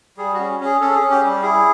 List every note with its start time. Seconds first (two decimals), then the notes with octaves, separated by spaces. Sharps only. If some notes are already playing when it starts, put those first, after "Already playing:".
0.17 G3 G#4
0.34 C#4 F#4
0.60 C#4 G#4
0.81 C#4 A4
0.95 G#4
1.00 C#4
1.11 G4
1.22 G3 G4
1.42 E4 G#4